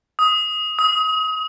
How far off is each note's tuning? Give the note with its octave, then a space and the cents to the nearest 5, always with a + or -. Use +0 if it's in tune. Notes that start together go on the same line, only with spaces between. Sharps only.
D#6 +15
D#6 +30